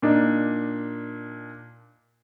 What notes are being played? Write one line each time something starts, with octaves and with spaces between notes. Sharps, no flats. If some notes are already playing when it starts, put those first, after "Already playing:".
A#2 D4 D#4